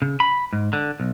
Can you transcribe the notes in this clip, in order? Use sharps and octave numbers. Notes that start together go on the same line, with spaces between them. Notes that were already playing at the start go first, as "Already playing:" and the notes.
C#3
B5
G#2
D3
B1